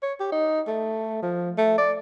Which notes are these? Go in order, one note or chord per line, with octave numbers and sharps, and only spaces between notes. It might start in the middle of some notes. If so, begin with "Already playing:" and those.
C#5
G4
D#4
A3
F3
A3
D5